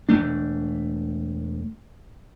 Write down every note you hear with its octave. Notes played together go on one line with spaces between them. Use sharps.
E1 F2 A3 D4